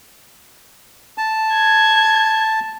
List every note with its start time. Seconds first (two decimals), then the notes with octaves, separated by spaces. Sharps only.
1.18 A5
1.53 G#6